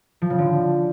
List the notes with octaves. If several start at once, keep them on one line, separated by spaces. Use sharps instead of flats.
F3
C#3
D3